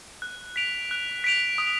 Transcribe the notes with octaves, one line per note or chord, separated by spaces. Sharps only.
F#6
B6 D7 F7
F#6
B6 D7 F7
D#6